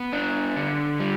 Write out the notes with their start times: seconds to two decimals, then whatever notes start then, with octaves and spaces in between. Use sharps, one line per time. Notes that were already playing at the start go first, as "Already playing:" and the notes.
Already playing: B3
0.13 D4
0.57 D3
0.99 G3